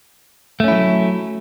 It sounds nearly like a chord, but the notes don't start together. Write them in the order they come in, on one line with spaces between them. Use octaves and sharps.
A3 C#4 E4 F#3